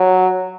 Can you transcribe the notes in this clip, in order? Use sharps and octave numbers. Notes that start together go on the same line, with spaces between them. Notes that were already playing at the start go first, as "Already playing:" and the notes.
Already playing: F#3